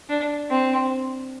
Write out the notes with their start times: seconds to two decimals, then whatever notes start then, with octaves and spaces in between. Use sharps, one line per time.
0.09 D4
0.50 C4